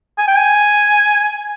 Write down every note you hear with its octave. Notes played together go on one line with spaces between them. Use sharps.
G#5
G5
G#5